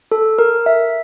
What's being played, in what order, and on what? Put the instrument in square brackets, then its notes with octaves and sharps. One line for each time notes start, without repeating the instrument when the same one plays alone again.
[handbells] A4
A#4
E5